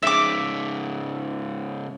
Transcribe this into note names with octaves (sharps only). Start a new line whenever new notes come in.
G#2 C#3 E5 D6